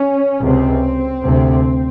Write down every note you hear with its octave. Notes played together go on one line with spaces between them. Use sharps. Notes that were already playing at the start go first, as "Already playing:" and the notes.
Already playing: C#4
C#2 C3 C4
D2 C3